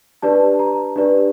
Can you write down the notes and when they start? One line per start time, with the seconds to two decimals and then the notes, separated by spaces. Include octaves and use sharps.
0.22 D4 G4 B4 D5 A5
0.59 A#5
0.96 D4 G4 B4 D5